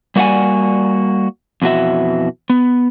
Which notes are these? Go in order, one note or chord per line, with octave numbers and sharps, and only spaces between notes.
G3 A#3 F#4 D5 F#5 G#5
F2 B2 E3 F#4 E5
B3